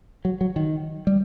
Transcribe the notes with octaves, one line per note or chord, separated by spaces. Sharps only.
F#3
F#3
D#3
G3